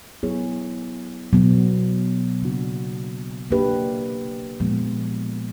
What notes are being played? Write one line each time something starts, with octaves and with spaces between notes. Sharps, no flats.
F#3 B3 E4 G#4 C#5
B2 F#3 B3
C#3 F#3 A#3 D4 F#4
A#3 D4 G4 B4
A#2 F3 G#3 B3